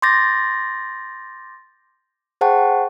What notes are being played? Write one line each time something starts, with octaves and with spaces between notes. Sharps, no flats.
C6 D6 G6 A6 A#6
G#4 C5 F#5 G5 A5 C#6